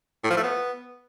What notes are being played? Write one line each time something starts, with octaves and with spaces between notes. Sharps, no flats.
A2
F3
A3
B3